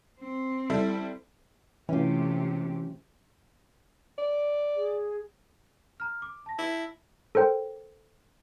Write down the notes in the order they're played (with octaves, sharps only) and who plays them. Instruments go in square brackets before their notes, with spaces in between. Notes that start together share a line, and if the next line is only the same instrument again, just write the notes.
[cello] C4
[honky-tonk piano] G3 E4 A4
[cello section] C3 A3 G4 [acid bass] E3 [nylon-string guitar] C#4 F4
[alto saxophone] D5
[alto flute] G#4
[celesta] A#5 F6
D6
A5 A#6
[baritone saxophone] E4
[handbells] A4 A#4 C5 G5